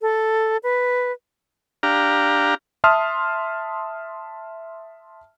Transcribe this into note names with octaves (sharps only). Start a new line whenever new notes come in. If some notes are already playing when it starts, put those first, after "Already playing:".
A4
B4
D4 G4 F5 A#5
E5 A5 C6 D#6 F6